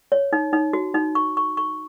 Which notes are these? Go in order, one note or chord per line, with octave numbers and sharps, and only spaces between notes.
C#5
D#4
D#4
F#4
D#4
C#6
C#6
C#6